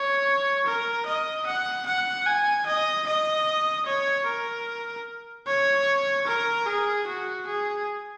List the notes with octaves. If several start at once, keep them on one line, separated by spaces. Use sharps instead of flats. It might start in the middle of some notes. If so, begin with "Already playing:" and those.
Already playing: C#5
A#4
D#5
F#5
F#5
G#5
D#5
D#5
C#5
A#4
C#5
A#4
G#4
F#4
G#4